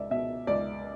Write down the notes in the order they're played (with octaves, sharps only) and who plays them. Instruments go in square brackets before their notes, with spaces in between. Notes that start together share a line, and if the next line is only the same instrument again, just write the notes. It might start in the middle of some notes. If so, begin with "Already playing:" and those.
Already playing: [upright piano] C#2 D5 E5
B2 E5
C#2 D5